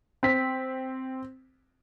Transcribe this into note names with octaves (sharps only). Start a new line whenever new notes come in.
C4 B6